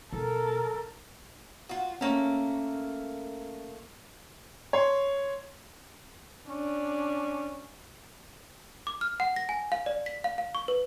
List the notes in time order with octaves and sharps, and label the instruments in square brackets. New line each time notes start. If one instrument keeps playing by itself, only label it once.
[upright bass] B2 [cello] A4 A#4
[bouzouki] F4 F#4
[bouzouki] A3 A#3 [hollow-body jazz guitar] C#4 C#5
[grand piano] C#5 C6
[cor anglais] C#4 [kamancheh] D4
[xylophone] D6
F6
F#5
A#6
G#5
F5
D5
B6
F5
F5
C#6
B4